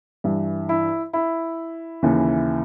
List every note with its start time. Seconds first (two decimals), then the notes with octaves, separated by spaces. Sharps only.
0.24 G2 E3
0.69 E4
1.13 E4
2.03 D#2 C#3 E3